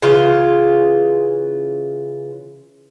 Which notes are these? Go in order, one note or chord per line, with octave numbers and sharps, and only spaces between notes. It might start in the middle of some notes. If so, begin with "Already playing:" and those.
C#3 E3 F4